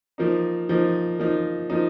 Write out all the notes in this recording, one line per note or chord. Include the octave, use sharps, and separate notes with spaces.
F3 A#3 D#4
F3 A#3 D#4
F3 A#3 D#4
F3 A#3 D#4